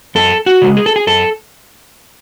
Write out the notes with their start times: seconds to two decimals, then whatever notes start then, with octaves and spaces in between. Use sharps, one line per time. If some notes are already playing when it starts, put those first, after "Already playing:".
0.15 F#2 A4
0.46 F#4
0.61 C#3 G#3
0.77 G#4
0.86 A4
0.96 G#4
1.07 F#2 A4